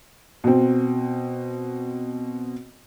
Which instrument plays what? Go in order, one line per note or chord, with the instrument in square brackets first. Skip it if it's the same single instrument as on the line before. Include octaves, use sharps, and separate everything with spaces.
[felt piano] B2 C4